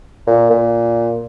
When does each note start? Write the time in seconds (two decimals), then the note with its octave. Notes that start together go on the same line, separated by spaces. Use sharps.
0.27 A#2
0.50 A#2